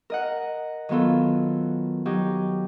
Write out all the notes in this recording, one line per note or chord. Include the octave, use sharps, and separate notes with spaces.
A#4 D#5 F#5
D#3 F#3 B3 F4 A4
F#3 D#4 G4